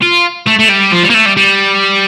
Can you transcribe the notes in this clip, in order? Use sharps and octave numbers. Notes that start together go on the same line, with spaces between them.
F4
A3
A3
G3
F3
G3
A#3
A3
G3
G3